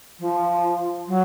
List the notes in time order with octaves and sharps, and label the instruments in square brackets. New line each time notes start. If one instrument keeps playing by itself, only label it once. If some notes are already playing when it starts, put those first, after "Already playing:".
[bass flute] F3
F#3